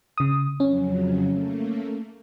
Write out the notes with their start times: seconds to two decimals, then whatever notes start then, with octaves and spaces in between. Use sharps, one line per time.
0.18 C#3 D#6
0.60 F2 C#3 F#3 C#4
1.27 A3 A#3